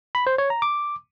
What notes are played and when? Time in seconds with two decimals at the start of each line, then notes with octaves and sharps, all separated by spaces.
0.15 B5
0.27 C5
0.38 C#5
0.50 A#5
0.62 D6